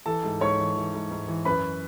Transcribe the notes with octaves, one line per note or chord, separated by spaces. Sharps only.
E3 A4 A5
G#2
G#2 C#5 C#6
E3
E3
G#2
G#2
E3
F#2 B4 B5